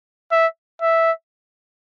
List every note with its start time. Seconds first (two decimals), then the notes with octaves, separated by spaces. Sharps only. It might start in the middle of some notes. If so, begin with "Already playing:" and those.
0.32 E5
0.82 E5